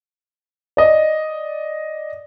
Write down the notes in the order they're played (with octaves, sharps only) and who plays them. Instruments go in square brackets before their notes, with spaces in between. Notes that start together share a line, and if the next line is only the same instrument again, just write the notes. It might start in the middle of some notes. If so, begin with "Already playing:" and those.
[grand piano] D5 D#5